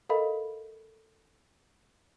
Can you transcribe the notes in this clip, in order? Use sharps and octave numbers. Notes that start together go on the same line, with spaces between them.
A4 A#4 D#5 F5 B5